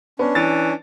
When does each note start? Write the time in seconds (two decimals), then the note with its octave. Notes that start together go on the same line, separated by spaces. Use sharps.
0.19 B3 C#4 D4
0.35 E3 A6